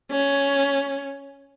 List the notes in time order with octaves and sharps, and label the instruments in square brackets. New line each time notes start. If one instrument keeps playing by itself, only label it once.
[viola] C#4